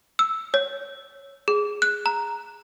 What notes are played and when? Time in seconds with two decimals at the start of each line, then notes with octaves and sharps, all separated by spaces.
0.19 E6
0.54 C#5
1.48 G#4
1.82 F#6
2.06 A#5